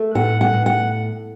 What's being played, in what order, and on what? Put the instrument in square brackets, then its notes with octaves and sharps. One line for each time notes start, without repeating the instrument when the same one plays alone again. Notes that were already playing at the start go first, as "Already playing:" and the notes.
Already playing: [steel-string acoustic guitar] A3
A2 F#5
F#5
A2
F#5